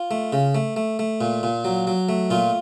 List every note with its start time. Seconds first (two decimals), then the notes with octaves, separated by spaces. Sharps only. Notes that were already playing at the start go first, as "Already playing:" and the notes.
Already playing: F4
0.11 A3
0.33 C#3
0.55 A3
0.76 A3
0.99 A3
1.21 A#2
1.43 A#2
1.65 F#3
1.87 F#3
2.09 A3
2.30 A#2 F4